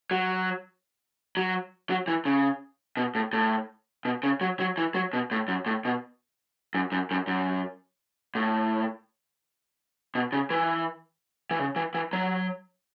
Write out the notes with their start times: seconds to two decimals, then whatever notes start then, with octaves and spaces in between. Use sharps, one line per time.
0.11 F#3
1.37 F#3
1.90 F#3
2.08 E3
2.25 C#3
2.97 B2
3.15 A2
3.33 A2
4.05 B2
4.23 C#3
4.41 F#3
4.60 F#3
4.78 E3
4.95 F#3
5.13 B2
5.31 A2
5.48 F#2
5.66 A2
5.85 B2
6.74 F#2
6.92 F#2
7.11 F#2
7.27 F#2
8.35 A2
10.15 B2
10.32 C#3
10.50 E3
11.51 E3
11.59 C#3
11.76 E3
11.95 E3
12.13 F#3